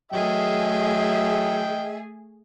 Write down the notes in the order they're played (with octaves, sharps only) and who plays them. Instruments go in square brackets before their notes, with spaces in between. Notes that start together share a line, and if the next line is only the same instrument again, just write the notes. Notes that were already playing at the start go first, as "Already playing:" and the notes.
[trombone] F#3 [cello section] A3 G#4 [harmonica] D#5 G5 [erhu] E5